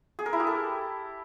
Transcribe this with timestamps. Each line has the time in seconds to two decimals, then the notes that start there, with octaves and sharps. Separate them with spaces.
0.19 G#4
0.26 A#4
0.33 E4
0.40 G4
0.47 A4